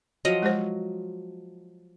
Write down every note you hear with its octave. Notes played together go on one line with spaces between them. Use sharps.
F3 F#3 D#5
G#3 G4 C5